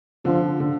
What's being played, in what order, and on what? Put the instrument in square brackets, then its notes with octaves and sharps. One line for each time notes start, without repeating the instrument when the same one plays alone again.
[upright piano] D3 [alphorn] F3
[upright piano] D3